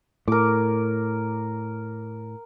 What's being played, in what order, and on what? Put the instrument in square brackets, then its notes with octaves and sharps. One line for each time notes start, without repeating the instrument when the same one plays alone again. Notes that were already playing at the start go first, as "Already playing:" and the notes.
[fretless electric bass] A2 [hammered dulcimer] A#4 D6